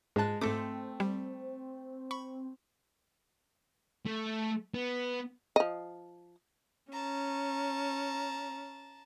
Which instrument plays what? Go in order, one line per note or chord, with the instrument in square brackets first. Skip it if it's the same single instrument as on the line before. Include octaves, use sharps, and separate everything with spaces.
[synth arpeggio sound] G#2 F#6 [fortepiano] G#3 A5
[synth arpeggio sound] G#2 A4 D6 [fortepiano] A3 [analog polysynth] C4
[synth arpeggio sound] G3
B5 C#6
[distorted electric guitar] A3
B3
[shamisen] F3 D#5
[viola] C#4 [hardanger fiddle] A5 A#5